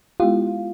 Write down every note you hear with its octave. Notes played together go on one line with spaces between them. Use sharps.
G#3 B3 E4 F4 G4